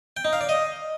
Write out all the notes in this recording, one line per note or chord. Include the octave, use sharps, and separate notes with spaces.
G5
D#4
F5
D5
D#5